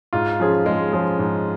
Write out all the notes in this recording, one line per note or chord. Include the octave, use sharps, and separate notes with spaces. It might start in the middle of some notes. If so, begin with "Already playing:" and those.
G#2 F4
F3 C#4 G#4
G#2 G#3
F3 C#4 G#4
G#2